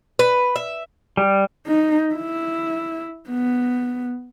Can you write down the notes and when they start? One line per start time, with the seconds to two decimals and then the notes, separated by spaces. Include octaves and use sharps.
0.19 B4
0.56 E5
1.17 G3
1.67 D#4
2.15 E4
3.29 B3